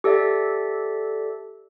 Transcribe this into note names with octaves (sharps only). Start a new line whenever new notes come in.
G4 A4 D5 E5